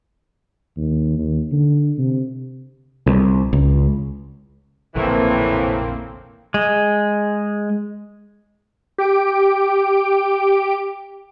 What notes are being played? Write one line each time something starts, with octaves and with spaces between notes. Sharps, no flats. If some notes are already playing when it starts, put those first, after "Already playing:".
D#2
D#2
D3
C3
C2
C#2
F1 A#1 A2 D3 E3 A#3 C4
G#3
G4 D7